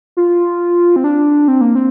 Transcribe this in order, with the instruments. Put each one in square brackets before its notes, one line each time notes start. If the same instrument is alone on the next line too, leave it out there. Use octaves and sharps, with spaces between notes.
[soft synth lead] F4
C4
D4
C4
A#3
C4